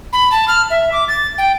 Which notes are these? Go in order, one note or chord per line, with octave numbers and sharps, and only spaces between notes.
B5
A5
F6
E5
D6
A6
G5